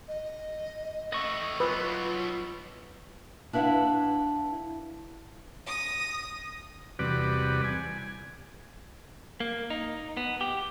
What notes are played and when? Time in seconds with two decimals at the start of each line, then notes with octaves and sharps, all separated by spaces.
0.08 D#5
1.12 A3 B4 D#5 C#6
1.60 F#3 B3 F4 B4
3.53 D4 E4 B4 F5 F#5
5.67 D#6 A#6
6.99 E2 C3 G3 F#4 B4 D5
7.64 G#5
9.40 A#3
9.70 D#4
10.17 B3
10.41 G4